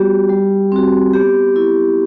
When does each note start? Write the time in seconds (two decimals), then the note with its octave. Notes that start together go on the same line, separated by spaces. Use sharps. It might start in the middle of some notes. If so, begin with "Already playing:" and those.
Already playing: G3 B3 F#4 G4
0.29 G3
0.72 C4 F#4
1.13 B3 G4
1.56 E4